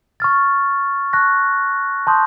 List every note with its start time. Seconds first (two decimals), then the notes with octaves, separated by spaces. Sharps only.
0.20 C#6 F6 A6
1.13 A5 C#6 F#6 A#6
2.07 A5 C6 D#6 G6